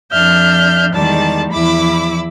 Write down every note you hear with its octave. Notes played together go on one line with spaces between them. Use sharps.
F2 D4 E5 F6 G6
E2 D#3 G3 G#3 D5 A5
E2 F3 E4 B5 D6 E6